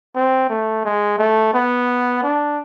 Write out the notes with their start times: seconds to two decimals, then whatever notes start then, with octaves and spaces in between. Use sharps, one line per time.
0.16 C4
0.49 A3
0.85 G#3
1.18 A3
1.54 B3
2.23 D4